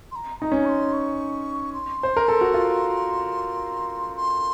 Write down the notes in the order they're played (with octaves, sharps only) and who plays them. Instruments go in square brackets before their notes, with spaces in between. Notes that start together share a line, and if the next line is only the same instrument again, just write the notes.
[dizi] C6
A#5
[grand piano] D#4 [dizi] A#5
[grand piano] C#4
[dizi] C#6
C6
C#6
C6
[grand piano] C5
A#4
A4
F#4
F4
[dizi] C6